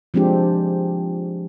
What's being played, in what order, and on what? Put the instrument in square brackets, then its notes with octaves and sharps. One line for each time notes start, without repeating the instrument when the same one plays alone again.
[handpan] F3 G#3 C4 D4 G4